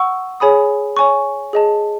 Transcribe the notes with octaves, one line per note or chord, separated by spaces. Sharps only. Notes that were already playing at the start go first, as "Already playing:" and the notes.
Already playing: F#5 C#6 E6
G#4 C#5 G#5 B5 D#6
C#5 G#5 C#6
G#4 D#5 A5